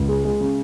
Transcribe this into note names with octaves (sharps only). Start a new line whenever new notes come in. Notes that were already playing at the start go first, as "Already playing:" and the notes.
Already playing: C#2
G#3
G#3
C#3